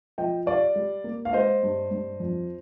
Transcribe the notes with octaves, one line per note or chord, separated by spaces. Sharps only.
F3 D#5 G5
G3 D5 F5
G3
A#3
F5
G#3 C5 D#5
G2
G2
F2